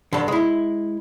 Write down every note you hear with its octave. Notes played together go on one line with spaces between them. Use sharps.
G2 D3
G#3 E4